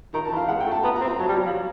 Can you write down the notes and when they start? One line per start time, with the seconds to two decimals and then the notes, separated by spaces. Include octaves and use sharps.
0.14 D#3 A#5
0.25 A5
0.32 E3
0.36 F5
0.48 G#3 F#5
0.61 G5
0.66 A3
0.72 A5
0.83 B3 A#5
0.96 A#5
1.01 C4
1.07 A#5
1.19 F#3 A5
1.28 G3
1.36 F#3
1.46 F3